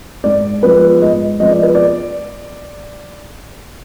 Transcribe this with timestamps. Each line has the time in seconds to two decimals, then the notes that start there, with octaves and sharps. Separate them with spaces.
0.24 G#2 D5
0.63 F3 G#3 B3 B4
1.02 G#2 D#5
1.40 F3 G#3 B3 D#5
1.52 D5
1.63 B4
1.75 D5